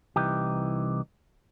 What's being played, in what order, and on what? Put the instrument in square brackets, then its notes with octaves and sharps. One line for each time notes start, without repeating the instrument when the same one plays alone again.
[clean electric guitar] C2 E3 D#4 G4